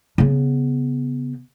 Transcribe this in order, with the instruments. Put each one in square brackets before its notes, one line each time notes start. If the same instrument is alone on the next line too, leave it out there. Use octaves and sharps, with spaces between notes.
[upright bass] C#3 B3